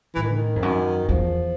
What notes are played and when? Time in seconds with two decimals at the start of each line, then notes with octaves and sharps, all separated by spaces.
0.15 A2 E3
0.23 D#3
0.30 D3
0.37 D#3
0.56 F2
0.62 F#2
1.08 E2 F3